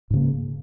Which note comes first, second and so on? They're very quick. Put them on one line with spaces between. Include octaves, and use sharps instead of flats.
G#2 C#3 A#3